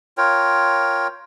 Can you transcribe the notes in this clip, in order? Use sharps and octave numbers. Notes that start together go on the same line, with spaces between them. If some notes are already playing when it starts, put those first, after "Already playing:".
F4 A#4 C#5 G5